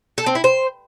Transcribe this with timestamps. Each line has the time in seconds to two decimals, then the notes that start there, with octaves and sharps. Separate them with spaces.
0.18 A4
0.26 C4
0.35 E4
0.44 C5